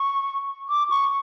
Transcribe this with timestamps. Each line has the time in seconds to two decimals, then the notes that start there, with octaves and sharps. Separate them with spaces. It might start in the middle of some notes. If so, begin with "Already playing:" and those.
Already playing: C#6
0.69 D6
0.90 C#6